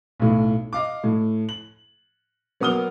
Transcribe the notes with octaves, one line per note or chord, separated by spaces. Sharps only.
B1 A2
D#5 F5 D6
A2
F#7
F#3 A#3 B3 D#6 F6 G7